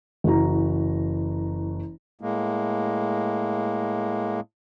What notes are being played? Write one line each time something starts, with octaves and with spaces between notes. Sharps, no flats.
F#1 E3 F#4 A#5
A2 G#3 A#3